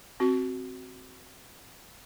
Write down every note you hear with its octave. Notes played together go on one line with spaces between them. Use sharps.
C4 F#4